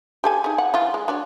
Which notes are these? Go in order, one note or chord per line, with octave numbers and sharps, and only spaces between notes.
G4 A4 G#5
D#4 G#4
F#5
E3 F4
G#3
D4 F#4 C#5